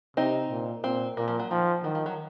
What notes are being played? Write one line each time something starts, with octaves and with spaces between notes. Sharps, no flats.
C3 C4 D#4
A#2
A#2 C4
A#2 A#3
F3
F#3
D#3 F3
D#3 F#3
F3
F#3